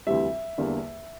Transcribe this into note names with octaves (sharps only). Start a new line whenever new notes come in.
D2 C3 E3 G3 E5
E2 D3 G3 A#3